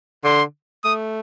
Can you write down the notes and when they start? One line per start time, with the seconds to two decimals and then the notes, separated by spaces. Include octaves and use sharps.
0.24 D3 C6
0.84 A3 D#6